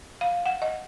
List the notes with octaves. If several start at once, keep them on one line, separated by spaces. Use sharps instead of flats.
F5
F#5
D#5